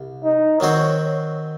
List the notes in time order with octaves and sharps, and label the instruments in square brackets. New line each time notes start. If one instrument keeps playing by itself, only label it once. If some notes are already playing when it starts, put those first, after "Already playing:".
Already playing: [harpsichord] C2
[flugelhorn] D#4
[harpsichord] D#3 F#3 C4 F#4 C5 [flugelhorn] C#5